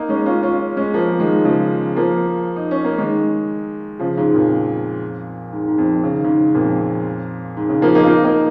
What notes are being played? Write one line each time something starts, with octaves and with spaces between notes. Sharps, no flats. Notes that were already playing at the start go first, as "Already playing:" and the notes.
Already playing: A#3 D#4
G#3 C#4
C#4 F4
C#4 F4
G#3 C#4
F3 A#3
D#3 G#3
C#3 F3
F3 A#3
D#4
C#4
A#3
D#3 G#3
C#3 F3
G#2 C#3
F2 A#2
G#2
G#2
F2
C#3
D#3
G#2 C#3
F2 A#2
G#2
G#2 C#3
F3 A#3
A#3 D#4
F4
A#3 D#4
A#3 D#4